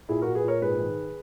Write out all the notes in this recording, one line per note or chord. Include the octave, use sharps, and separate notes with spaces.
A#2 E4 G#4
A#2 F#4 A#4
G#4 B4
A#2 A#4 C#5
G#2 G#4 B4
D#3